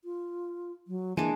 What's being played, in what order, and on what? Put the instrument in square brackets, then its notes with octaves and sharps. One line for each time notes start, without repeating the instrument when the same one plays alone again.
[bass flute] F4
F#3
[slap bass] E3 [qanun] G#3 D4 [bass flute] A#3